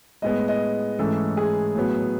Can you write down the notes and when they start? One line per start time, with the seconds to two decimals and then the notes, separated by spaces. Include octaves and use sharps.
0.22 A2 G#3 B3 D#5
0.48 D#5
0.99 G#2 E3 A3 C#4 A4
1.37 G#4
1.75 A2 F#3 B3